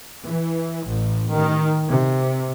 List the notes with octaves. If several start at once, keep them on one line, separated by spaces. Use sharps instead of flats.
E3
A1
D#3
C3